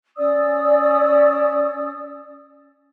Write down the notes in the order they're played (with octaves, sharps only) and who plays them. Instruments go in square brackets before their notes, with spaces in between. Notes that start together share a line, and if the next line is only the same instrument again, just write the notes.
[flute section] C#4 D5 D#6 E6